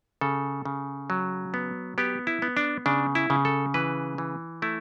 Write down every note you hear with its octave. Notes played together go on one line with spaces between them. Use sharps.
C#3 A4
C#3
F#3
B3
B3 G4
E4
B3
D4
C#3 D4
E4
C#3
A4
E3 B4
E3
A3 E4